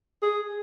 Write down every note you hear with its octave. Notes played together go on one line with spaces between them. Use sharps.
G#4